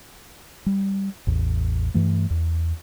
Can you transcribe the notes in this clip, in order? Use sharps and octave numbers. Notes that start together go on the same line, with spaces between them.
G3
A1 E2
G2 E3 A3
E2